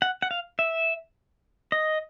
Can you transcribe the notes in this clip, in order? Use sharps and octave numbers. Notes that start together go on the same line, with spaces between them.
F#5
F#5
F5
E5
D#5